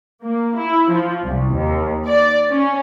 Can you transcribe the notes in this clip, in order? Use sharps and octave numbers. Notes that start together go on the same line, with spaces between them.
A#3
E4
F3
C2
D#2
D5
C#4